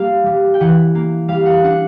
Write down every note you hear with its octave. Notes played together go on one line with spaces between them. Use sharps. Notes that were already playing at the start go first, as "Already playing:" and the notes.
Already playing: G3 A#3 F5
G3
G5
E3 F#5
A#3
G3 F5
F#5
D4 F#5